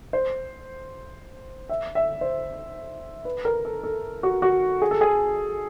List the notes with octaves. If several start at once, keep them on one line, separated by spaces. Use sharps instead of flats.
C5
E5
E5
C5
B4
A#4
A4
A4
F#4
F#4
G#4
A4
G#4